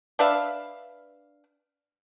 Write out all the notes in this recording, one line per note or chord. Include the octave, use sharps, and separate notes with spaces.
D4 B4 E5 F5